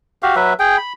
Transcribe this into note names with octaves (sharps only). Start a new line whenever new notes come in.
F#4 G4 F5
F#3 B4 E5
G#4 G5
B5